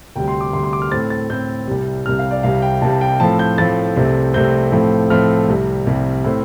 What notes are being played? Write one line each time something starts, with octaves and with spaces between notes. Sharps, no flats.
D2 C3 G3 G5
C6
D6
D2 C3 G3 C6
C6
D6
F6
A2 A3 C4 A6
A6
A2 A3 C4 G6
C2 C3 G3
C2 C3 G3 F6
F5
D5
C2 C3 G3 F5
G5
C2 C3 G3 A5
A5
G5
A2 F3 A3 C4 A5
G6
A2 F3 A3 C4 A6
C2 C3 A3 C4
C2 C3 A3 C4 G6
A2 F3 A3 C4
A2 F3 A3 C4 F6
C2 C3 G3
C2 C3 G3
A2 A3 C4